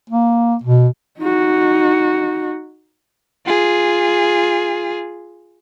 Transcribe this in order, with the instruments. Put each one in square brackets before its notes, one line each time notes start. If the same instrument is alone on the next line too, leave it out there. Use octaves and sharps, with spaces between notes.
[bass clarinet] A#3
B2
[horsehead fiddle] D#4 F#4
[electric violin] F4 G#4